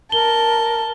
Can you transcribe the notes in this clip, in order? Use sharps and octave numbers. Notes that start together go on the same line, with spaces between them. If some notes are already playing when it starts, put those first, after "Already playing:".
A#4 A5 G7